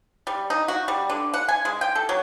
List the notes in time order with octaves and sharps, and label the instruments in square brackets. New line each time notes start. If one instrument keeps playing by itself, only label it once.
[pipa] G3
D#4
F#4
G3
D3
F#5
G#5
G#3
G5
A4
F#3